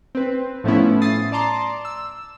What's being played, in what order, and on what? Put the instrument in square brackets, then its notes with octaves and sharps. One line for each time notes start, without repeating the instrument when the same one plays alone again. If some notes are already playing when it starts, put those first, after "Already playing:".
[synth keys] C4 B4
A2 F3 A3 B3 C#4 E4
D#6 A6 C7
D5 A5 A#5 C6 D6
E6